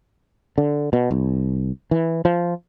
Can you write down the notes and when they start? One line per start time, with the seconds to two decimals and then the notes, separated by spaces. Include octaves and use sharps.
0.58 D3
0.93 B2
1.11 C2
1.91 E3
2.25 F3